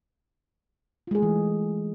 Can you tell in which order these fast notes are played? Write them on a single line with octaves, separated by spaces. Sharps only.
F4 G#3 G#4 A3 E3